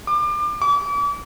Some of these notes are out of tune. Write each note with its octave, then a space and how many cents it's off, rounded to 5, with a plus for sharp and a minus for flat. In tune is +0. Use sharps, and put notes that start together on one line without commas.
D6 +30
D6 -40